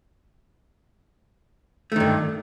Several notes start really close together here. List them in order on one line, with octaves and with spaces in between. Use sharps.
A3 D#3 G2